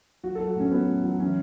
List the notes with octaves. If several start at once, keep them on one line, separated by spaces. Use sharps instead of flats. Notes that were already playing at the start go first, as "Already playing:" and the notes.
F#3 F#4
A4
F#3
F#4
A2 C#4
F#3 B3
A2
F#3
E3 C#4